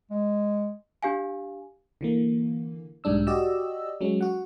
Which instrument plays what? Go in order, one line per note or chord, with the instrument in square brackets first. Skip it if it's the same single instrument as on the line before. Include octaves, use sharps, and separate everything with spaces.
[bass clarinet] G#3
[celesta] D4 G4 F5 G#5
[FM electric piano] D3 E3 A#3
B1 G#2 G3 D4 E6
F#4 G4 D5 D#5 E6
F#3 G#3 C#4
F#4 F#5